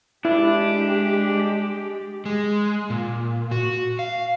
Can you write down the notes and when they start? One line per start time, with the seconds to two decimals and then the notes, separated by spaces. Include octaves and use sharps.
0.25 G#3 D4 E4 G4
2.25 G#3
2.90 A#2
3.51 F#4
3.99 F5